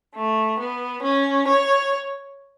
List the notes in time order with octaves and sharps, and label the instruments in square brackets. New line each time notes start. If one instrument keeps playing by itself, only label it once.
[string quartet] A3
B3
C#4
C#5